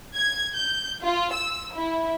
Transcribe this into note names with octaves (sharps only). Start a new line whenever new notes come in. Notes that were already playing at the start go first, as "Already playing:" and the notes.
G#6
G6
F4
E6
E4